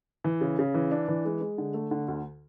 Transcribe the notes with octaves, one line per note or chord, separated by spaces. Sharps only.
E3
C#3
C#3
E3
D4
E3
G#3
G#3
D3
A3
D3
D2